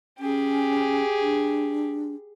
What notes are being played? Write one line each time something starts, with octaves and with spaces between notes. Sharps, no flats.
C#4 G4 G#4
D4